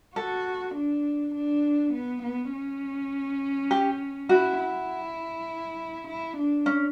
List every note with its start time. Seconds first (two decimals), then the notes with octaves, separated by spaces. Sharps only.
0.16 F#4 A4
0.75 D4
1.34 D4
1.93 B3
2.23 B3
2.53 C#4
3.71 G4
4.29 E4 F#4
4.59 E4
6.07 E4
6.37 D4
6.66 C#4